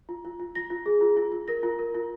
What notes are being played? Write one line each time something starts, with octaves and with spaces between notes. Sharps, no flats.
F4
F4
F4
F4 A#6
F4
G#4
F4
F4
F4
A#4 A#6
F4
A#4
F4